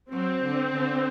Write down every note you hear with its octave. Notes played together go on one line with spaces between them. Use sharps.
F#3 C4
D3
D3